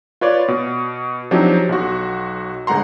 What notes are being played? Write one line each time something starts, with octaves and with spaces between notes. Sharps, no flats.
F4 B4 C#5 D5
B2
F3 F#3 C4 D4 D#4 G4
B1 F#4
G1 G#3 F#5 A#5 C6